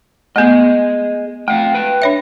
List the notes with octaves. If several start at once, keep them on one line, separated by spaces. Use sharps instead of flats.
A3 B3 G#4 D#5
A3 C4 F5 G5
B4 G5
D4 C#5 E5